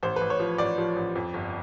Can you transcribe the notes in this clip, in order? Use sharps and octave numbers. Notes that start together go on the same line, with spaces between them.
A1 C5
B4
A1
C#5
F3
A1 D5
F3
A1
F2
G1